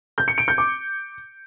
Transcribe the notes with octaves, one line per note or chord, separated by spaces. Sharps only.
G6
C#7
D7
G6
D6